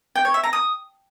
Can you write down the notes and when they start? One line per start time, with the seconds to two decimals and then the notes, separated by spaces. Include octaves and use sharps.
0.15 G5
0.25 C#5
0.34 E5
0.43 A#5
0.53 D#6